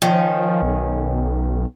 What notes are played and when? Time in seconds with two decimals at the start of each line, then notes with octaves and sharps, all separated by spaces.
0.02 D#3 F3 C#4
0.62 B1